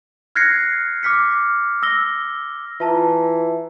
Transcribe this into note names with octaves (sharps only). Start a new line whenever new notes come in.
F6 F#6 G#6 A#6 C7 C#7
D6 F6 B6 C#7
E6 A#6 G7
E3 F4 A5 A#5